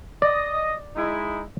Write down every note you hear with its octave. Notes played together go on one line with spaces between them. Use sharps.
D5 D#5
G#3 D#4 E4